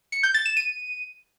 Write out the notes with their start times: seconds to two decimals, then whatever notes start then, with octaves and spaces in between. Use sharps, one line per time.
0.12 C#7
0.23 G6
0.34 A6
0.46 E7
0.57 D#7